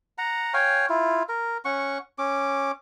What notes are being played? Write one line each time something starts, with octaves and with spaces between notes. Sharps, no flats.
F#5 A#5
C#5 F5 G5 G#5
E4 F4
A#4
C#4 F#5 C#6
C#4 D6